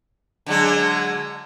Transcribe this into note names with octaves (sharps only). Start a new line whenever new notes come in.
D3 F#3 G#3